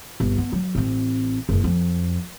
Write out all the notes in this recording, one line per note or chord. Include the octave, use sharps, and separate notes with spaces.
G1
B3
F#3
A1 C4
F#1 E2
F2